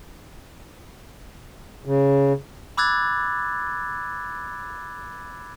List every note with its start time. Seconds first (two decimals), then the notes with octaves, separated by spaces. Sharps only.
1.85 C#3
2.77 B5 D6 E6 F#6 G#6 A6